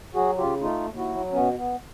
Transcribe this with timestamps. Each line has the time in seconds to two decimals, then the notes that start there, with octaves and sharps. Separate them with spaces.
0.14 F#3 F#4 G#4
0.37 C#3 F4 G4
0.61 A3 D#4 F4
0.86 D#2
0.97 E4 F#4
1.08 F#3
1.32 B2 B3 C#4
1.56 B3